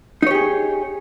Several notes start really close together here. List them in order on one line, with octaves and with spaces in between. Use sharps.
D#4 C#5 G4 G#4